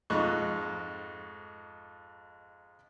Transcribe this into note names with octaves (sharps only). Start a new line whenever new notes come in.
F2 G#2 D#4 C#6 F#6